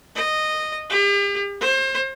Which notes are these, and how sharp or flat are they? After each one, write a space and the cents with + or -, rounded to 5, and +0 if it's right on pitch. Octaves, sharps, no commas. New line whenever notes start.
D#5 -10
G4 +40
C5 +30